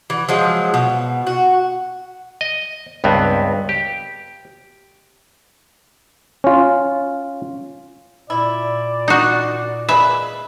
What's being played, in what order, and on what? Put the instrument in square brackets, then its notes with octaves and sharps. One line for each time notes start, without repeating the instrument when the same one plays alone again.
[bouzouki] E3
F3 F#3 G#3
B2
F#4
[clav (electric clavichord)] D#5
C#2 G2 B3 C4
G4
C#4 F4
[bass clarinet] A#2 [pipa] E4 [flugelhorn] D5
[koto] D#4 F#4
[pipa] G#3 A#3 B4 [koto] E5